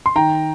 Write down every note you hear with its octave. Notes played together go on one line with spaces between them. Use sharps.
C6
D#3 G5 A#5